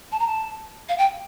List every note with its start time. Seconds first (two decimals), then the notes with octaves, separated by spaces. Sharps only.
0.12 A5
0.19 A#5
0.27 A5
0.89 F5
0.98 G5